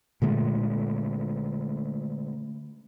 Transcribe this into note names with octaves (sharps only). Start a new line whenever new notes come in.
A#2 D3 G#3 A3